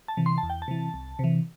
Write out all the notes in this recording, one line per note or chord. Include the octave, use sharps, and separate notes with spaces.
A5
C3 E3
C6
A5
E2
G5
A5
C3 E3
C2
C3 E3